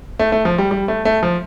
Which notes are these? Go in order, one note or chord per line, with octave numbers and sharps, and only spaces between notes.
A3
A3
F3
G3
G3
A3
A3
F3